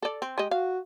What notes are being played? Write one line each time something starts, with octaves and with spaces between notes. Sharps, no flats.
A4 D5
C4
G#3 G4 D#5
F#4 F5